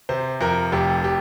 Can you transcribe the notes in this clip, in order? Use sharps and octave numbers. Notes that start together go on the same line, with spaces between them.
C3 C5
F2 A#4
F1 G4
G4